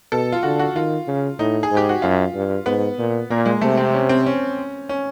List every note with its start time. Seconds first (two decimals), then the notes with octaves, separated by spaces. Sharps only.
0.12 B2 A4
0.32 F4
0.43 D3 F#4
0.59 F#4
0.75 D#3 F4
1.07 C#3
1.39 A2 D#4
1.63 G#4
1.71 G#2
1.77 G4
1.89 F#4
2.02 F#2 F4
2.35 G2
2.66 G#2 B3
2.99 A#2
3.30 A#2 A#3
3.46 G#3
3.61 C3 A3
3.77 C4
3.94 C#4
4.09 C4
4.26 C#4
4.89 C#4